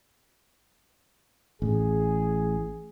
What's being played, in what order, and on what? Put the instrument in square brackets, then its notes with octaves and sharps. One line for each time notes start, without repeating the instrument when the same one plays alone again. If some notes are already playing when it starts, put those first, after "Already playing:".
[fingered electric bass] A1 [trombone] G#4